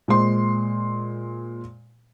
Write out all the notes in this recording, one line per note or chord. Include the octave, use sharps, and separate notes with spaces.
A#2 G#3 C5 C6